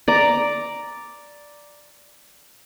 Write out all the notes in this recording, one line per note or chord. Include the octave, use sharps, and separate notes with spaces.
D5 A#5